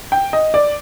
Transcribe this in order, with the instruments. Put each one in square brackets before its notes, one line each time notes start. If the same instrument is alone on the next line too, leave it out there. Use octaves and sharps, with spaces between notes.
[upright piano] G5
D#5
D5